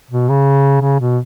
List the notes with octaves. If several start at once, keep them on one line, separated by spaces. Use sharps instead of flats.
B2
C#3
C#3
B2